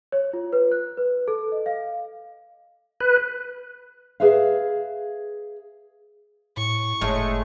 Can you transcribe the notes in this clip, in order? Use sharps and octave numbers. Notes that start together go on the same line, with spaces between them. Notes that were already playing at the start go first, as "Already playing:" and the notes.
C#5
F4
B4
F#6
B4
A4
D#5
F5
B4
G#4 B4 E5 F5
A2 C#6
F#1 A2 G#3 A3